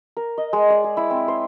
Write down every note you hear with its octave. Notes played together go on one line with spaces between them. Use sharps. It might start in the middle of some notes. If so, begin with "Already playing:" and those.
A#4
D#5
G#3
D5
G#4
E4
C4
C5